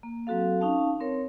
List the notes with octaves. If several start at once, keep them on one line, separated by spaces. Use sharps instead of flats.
A#3
F#3 C4 F#4 A4 F5
C#4 D#4 F5 A5
C4 A#4 C#5